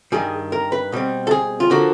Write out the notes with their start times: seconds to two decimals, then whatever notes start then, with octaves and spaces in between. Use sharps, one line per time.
0.12 G2 D#3 G3 G#4
0.52 A#4
0.72 B4
0.92 B2 G3 C4
1.27 A4
1.31 G#4
1.60 F4
1.70 D3 F3 A#3 D4 F#4